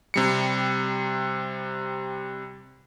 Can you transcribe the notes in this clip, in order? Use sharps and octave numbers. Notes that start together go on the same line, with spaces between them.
C3 G3 C#7